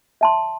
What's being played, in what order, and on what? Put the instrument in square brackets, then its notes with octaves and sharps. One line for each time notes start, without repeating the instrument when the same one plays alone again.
[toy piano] E5 A5 C6